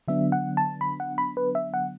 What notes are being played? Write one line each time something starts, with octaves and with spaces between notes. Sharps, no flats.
D3 F#3 B3 D4 E5
F#5
A5
B5
F#5
B5
B4
E5
F#5